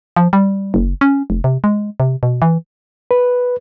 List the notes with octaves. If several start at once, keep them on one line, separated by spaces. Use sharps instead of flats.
F3
G3
F#1
C#4
F1
C3
G#3
C3
B2
E3
B4